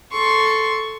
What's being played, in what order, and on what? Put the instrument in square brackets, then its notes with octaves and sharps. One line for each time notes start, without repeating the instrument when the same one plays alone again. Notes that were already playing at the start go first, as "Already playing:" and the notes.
[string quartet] A4 C6 C#6